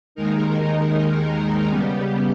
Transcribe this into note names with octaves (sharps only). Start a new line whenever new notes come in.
D#2 D#3 G#3 D#4 A#4
C#3 G3 B3 G4